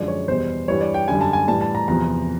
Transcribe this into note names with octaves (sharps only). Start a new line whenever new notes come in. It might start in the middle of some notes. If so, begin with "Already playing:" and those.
Already playing: F#2 D3 F3 G#3 D5
C#5
E2 B2 G3 C5
G2 E3 G3 C#5
D5
G5
F#2 D3 G3 G#5
A5
G#5
A2 E3 G3 A5
A5
A#5
E2 C3 F3 A#5